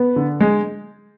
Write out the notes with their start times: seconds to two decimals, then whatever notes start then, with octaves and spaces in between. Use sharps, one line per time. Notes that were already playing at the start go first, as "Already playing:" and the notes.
Already playing: B3
0.16 D3
0.40 G#3